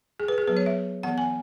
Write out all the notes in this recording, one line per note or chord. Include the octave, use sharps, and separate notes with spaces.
G#4
B4
G#4
F#3 B3 B4
C#5
E5
E3 B3 F#5
G#5